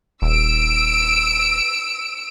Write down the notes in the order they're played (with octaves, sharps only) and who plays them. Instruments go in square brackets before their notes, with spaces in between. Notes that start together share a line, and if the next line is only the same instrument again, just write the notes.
[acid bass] D#1 [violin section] E6 D7